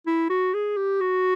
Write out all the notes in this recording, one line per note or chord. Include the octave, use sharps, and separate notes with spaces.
E4
F#4
G#4
G4
F#4